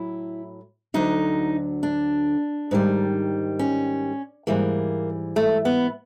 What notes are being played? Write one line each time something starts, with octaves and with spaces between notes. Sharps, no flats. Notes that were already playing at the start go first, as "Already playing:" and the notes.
Already playing: A2 F#3 E4
D2 D3 F#3 D#4
D4
G#2 D#3 G3
C#4
G#2 E3 G3 A#3
A3
B3